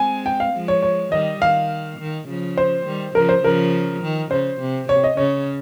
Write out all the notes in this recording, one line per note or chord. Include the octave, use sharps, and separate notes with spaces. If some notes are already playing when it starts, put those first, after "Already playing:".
Already playing: G#3 C4 G#5
G5
F5
F3 G#3
C#5
C#5
D#3 G3 D#5
D#3 F5
D#3
C#3 F3
C5
D#3 G3
C#3 F3 A#4
C5
C#3 F3 A#4
D#3
C#3 C5
C3
C3 C#5
D#5
C#3 C#5